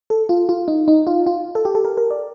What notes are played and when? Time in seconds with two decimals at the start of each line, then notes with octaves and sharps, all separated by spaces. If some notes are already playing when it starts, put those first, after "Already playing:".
0.10 A4
0.29 F4
0.49 F4
0.68 D#4
0.88 D#4
1.07 F4
1.26 F4
1.55 A4
1.65 G4
1.75 A4
1.85 A#4
1.97 A#4
2.11 D5